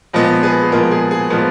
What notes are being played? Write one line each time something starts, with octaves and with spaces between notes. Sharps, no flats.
A#2 F3 G#3 B3 B4 D#5
G#4 B4
G#4
A#2 F3 G#3 B3 A#4
G#4
G#4
A#2 F3 G#3 B3 A#4